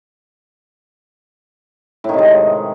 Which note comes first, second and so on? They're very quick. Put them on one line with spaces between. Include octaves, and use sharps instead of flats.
A2 D#3 C3 G#3